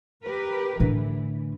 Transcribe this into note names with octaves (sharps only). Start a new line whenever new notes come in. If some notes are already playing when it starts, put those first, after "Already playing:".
G4 A#4 B4
A2 D3 E3